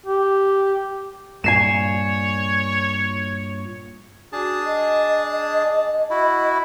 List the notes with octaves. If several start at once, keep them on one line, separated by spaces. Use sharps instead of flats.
G4
G2 A#2 C#5 G#5 C7 E7
D4 F#4 G#4 A5
D#5
E4 F#4